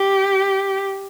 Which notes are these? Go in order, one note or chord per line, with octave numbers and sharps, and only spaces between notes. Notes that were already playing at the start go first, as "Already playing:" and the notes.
Already playing: G4